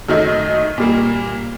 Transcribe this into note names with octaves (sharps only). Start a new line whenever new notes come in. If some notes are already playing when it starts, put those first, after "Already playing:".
F#2 D#3 F#3 A3 D#4
A#2 G3 A#3